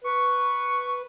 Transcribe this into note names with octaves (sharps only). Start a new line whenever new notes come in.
B4 C#6